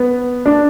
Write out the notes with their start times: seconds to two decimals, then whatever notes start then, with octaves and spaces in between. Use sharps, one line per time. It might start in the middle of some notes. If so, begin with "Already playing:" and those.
Already playing: B3
0.46 D4